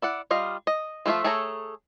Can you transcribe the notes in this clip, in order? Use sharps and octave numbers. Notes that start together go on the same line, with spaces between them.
E4 D5 F#5
G3 F4 D#5 F5
D#5
F3 A3 E4 F4 E5
A3 G#4 A4 C#5 A#5